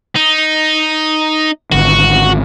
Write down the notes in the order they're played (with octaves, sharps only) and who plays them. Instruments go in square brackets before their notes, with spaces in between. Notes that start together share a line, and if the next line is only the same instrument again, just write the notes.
[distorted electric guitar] D#4
[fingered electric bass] G#1 D3 [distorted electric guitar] F#4